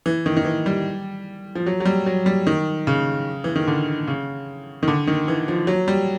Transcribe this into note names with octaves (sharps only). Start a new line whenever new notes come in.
E3
D#3
D#3
E3
G3
F3
F#3
F#3
G3
F#3
G3
D#3
C#3
E3
D#3
D3
C#3
D#3
D3
D#3
E3
F3
F#3
G3